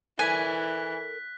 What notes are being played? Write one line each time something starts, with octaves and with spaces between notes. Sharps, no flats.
E3 A4 A#4 D5 G#5 F#6 B6